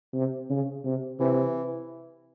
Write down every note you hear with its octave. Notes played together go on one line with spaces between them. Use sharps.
C3
C#3
C3
C3 E3